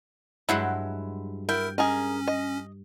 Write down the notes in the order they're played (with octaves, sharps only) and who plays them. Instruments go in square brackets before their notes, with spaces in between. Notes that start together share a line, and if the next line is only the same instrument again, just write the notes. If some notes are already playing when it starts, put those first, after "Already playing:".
[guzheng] G2 F#3 G#3 [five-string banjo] E4 F#5
[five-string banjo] E4 [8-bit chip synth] A#4 [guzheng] G5
[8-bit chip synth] C#4 [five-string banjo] G#4 A#4 D#5
[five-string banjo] D#5